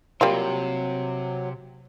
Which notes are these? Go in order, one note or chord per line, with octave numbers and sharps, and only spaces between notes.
C3 F#3 G3 A#3 F4